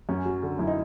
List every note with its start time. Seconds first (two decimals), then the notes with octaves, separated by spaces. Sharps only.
0.09 F#2 C#4
0.25 F#3
0.43 D3
0.59 F#2 E4
0.67 D#4